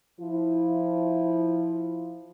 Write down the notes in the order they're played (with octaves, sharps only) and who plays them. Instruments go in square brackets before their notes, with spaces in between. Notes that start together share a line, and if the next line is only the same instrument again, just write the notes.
[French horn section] F3 E4